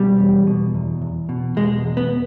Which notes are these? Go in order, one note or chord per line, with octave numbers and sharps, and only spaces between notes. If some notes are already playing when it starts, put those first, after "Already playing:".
Already playing: B2 G3
E2
B2
E2
E2
B2
B2 G#3
E2
B3